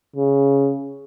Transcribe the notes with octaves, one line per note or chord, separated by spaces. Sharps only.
C#3